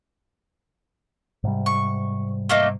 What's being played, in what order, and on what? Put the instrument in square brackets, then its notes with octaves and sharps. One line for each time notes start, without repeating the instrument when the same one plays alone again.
[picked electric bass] G#2 C3 G3
[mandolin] C#6
A3 A#3 D#4